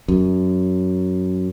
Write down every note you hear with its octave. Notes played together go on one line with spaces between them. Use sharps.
F#2